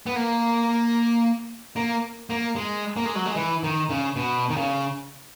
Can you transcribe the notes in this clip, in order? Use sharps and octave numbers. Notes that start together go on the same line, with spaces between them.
B3
A#3
A#3
A#3
G#3
A#3
G#3
F#3
G#3
E3
D#3
C#3
B2
D#3
C#3